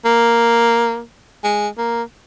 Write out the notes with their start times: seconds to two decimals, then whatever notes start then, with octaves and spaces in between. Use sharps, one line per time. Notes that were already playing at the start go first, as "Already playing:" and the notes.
0.05 A#3
1.44 G#3
1.78 A#3